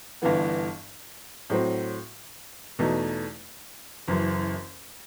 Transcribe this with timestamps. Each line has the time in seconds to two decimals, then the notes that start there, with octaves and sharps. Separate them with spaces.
0.22 G1 G2 E3 B3
1.50 A2 F#3 C4
2.79 E2 B2 A3 D#4 A4
4.08 F#1 F#2 E3